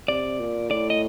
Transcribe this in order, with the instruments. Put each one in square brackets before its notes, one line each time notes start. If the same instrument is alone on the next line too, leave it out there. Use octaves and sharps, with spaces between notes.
[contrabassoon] C3 [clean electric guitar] D5
[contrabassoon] A#2
[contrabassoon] A2 [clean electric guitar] D5
[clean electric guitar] D#5